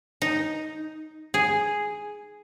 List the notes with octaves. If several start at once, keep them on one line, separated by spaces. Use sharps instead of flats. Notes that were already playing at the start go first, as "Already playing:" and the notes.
D#4
G#4